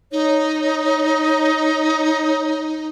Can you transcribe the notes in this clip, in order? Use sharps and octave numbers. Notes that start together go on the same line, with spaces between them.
D#4 C#5